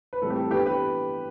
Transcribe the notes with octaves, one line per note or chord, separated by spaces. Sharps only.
B4
A2 E3 G3 C4 A4
G4
A4
E3 B3 D4 G4 B4
G4 B4